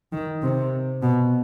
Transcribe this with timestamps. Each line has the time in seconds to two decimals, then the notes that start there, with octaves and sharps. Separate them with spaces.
0.13 D#3
0.43 C3
1.03 B2